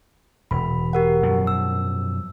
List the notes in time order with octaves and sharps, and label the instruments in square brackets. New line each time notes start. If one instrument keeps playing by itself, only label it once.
[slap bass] E1 [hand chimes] B5
[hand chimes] G4 A#4 F#5
[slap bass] F#2 B2 F3
[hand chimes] E6